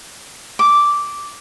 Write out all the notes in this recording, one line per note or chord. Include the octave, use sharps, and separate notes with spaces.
D6